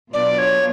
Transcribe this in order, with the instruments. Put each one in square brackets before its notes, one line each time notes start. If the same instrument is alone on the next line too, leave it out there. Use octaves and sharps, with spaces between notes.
[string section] B2 F#3 B3 D4 F4 [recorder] D5
[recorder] C#5